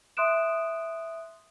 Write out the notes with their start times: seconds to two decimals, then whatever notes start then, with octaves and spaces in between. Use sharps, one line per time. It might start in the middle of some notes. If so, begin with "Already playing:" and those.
0.17 E5 C6 D#6 F#6 D7 E7